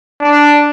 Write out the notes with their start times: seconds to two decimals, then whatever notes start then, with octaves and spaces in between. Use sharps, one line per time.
0.21 D4